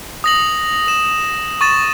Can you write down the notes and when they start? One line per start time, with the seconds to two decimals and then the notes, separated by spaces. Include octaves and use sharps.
0.24 D#6 A#6 F#7
0.88 E7
1.61 C#6 A6 E7